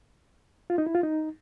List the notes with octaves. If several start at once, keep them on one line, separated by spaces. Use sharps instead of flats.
F4
D#4
E4
F4
D#4